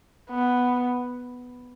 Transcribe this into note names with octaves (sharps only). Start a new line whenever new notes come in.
B3